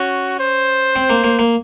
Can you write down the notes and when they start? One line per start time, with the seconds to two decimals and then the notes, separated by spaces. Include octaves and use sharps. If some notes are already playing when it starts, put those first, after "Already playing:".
Already playing: C#4 F#4
0.39 C5
0.96 C4
1.10 A#3
1.24 A#3
1.39 A#3